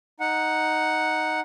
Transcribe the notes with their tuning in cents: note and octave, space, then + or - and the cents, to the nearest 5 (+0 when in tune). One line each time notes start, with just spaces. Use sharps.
D#4 +0 F#5 +0